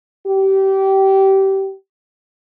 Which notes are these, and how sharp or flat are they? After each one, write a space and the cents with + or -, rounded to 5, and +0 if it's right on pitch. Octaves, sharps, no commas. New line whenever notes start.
G4 -25